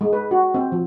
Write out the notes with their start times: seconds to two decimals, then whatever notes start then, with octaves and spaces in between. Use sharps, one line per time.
0.01 G#3
0.13 B4
0.31 F#4
0.54 C4
0.72 F3